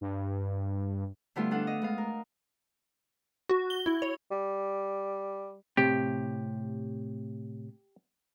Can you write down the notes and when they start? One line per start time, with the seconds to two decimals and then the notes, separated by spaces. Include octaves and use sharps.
0.01 G2
1.36 D3 G3 A3 B3 E4 F4
1.51 D4 A4 F5 F#5
1.67 D#5
1.82 G#3 B3 F5
1.98 A#4
3.49 F#4
3.70 G7
3.86 E4
4.02 C#5
4.31 G3
5.77 A2 C3 G4